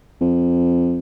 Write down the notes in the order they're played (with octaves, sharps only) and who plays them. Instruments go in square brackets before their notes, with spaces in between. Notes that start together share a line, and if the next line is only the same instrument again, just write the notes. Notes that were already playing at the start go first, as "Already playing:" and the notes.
[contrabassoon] F2